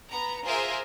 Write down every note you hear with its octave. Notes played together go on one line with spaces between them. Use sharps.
B3 A#5
F4 G#4 A#4 C5 E5 G#5